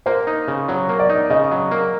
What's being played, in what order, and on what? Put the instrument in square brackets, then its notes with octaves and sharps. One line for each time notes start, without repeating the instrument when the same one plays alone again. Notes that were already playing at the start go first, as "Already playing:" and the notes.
[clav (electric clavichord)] A#3 [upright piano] C5
[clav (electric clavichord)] D#4
C#3
[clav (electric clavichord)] F#3 [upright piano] C#5
[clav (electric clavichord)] A#3
[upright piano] D5
[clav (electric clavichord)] D#4
[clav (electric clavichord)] C#3 [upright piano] D#5
[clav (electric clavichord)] F#3
A#3